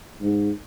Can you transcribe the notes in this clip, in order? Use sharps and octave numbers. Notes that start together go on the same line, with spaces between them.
G#2